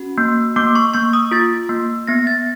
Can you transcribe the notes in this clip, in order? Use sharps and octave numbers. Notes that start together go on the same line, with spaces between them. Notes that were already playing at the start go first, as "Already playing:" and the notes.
Already playing: C#4 F#4
A#3
A#3 D6
C#6
A#3 C#6
D#6
F4 A6
A#3
B3 A#6
A6